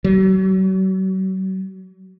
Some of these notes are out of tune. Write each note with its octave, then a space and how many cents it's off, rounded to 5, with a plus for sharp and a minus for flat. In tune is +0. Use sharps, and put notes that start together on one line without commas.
F#3 +40